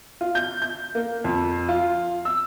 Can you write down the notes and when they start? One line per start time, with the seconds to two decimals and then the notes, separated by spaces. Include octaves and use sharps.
0.21 F4
0.35 G6
0.62 G6
0.95 A#3
1.24 F2
1.69 F4
2.25 E6